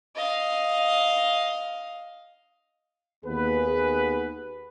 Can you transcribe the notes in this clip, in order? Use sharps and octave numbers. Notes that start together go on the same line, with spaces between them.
D#5 F5
D#2 B3 G#4 B4